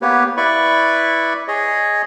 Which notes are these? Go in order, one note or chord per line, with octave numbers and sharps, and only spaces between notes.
A#3 B3 G4 B4 C#5
E4 B4 D5 B5 C#6
G#4 C#5 D#5